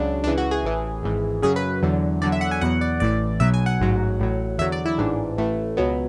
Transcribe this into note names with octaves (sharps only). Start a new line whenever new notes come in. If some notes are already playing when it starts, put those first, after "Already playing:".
Already playing: C#2 C#3 F#3 D4
C#2 C#3 E3 D4
F#4
G#4
A1 A2 E3
G#1 G#2 E3
F#2 C#3 F#3 G#4
B4
E2 D3 F#3
E2 D3 F#3 D5
E5
F#5
G#5
E2 B2 F#3 F#5
D5
A1 A2 E3 D5
B1 B2 F#3 E5
G#5
F#5
A1 G#2 F#3
A1 A2 F#3
E2 D3 F#3 E5
D5
E4
A1 G#2 E3 D4
A1 A2 E3 A3
C#2 B2 F#3 B3